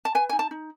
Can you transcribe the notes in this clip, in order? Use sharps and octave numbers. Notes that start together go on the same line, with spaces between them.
A5
B4 G#5
D#4 G#5
A5
D#4